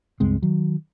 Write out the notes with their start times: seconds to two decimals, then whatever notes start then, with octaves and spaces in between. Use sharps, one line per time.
0.20 C#2 G2 G#3 C4
0.42 D#3 F#3